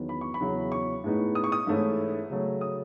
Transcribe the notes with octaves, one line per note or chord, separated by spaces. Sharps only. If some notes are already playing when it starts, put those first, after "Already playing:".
Already playing: E2 D#3 F#3 B3
B5
C#6
B5
E2 C#3 F#3 C#4 E4
C#6
A2 G#3 B3 D#4
D#6
C#6
D#6
G#2 E3 A3 C#4 E4
C#3 F#3 A3
D#6